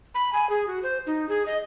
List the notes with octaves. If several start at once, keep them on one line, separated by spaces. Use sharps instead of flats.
B5
G#5
G#4
F#4
C5
D#4
G#4
D#5